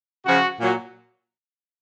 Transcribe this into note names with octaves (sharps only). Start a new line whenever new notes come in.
C#3 F3 F#4
A#2 F#3